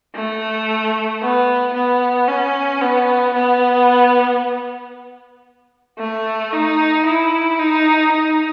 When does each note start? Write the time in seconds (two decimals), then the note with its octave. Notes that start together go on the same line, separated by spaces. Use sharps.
0.15 A3
1.22 B3
1.74 B3
2.28 C#4
2.81 B3
3.34 B3
5.99 A3
6.53 D#4
7.06 E4
7.59 D#4
8.12 D#4